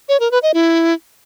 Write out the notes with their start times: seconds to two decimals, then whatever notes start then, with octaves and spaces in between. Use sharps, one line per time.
0.09 C#5
0.20 A#4
0.31 B4
0.43 D#5
0.54 E4